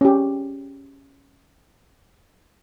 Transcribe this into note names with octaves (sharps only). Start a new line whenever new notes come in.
C#4 G4